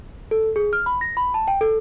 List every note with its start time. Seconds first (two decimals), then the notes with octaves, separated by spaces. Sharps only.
0.31 A4
0.56 G#4
0.73 F6
0.86 B5
1.01 A#6
1.17 B5
1.34 A5
1.48 G5
1.61 A4